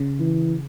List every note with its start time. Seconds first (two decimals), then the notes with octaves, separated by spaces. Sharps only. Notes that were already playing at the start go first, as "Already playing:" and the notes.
Already playing: C#3
0.20 E3